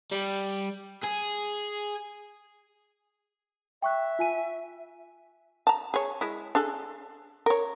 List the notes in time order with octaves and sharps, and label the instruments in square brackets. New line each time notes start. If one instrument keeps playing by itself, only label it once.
[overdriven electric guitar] G3
G#4
[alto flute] E5 [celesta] G5 C#6 F#6
[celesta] F4 G#5 D#7
[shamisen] A5 A#5
G#4 C#5
G#3 E4
D4 G#4 A4
A#4 C#5